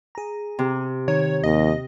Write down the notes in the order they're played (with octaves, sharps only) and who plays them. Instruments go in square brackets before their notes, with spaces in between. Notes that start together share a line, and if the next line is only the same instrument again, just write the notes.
[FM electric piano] G#4 A#5
[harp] C3
[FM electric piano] D#3 [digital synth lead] C#5
[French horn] D#2 [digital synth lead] D#5